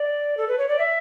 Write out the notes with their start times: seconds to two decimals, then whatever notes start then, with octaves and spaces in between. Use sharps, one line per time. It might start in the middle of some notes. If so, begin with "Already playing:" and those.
Already playing: D5
0.37 A4
0.48 B4
0.58 C#5
0.68 D5
0.79 E5